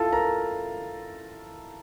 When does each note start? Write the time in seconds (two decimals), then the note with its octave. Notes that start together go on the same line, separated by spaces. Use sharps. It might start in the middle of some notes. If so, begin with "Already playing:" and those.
Already playing: E4 F4 A4 F5 A5
0.13 A#4 A#5